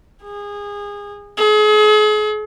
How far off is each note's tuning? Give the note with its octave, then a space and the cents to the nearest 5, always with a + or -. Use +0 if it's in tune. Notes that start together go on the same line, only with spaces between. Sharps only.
G#4 -25
G#4 +40